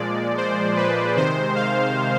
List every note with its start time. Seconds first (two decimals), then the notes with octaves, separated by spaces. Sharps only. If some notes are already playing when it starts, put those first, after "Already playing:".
Already playing: A#2 F3 G#3 D5
0.37 C5
0.77 B4
1.16 C3 D#3 G#3 C5
1.56 F5